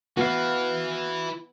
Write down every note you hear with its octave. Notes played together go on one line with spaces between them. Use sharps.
B3 E4 F#4 B4 F5